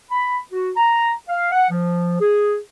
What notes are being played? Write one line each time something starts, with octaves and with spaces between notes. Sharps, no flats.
B5
F#4
A#5
F5
F#5
F3
G#4